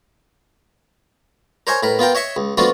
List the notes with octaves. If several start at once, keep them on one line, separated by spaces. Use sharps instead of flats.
A#4 C5 C#5 D#5 G#5
A2 A#4 B4
B3 F4 A#4 G5
C#5 D#5 E5 C#6
C#2
F3 A3 B3 D4 F4 F#4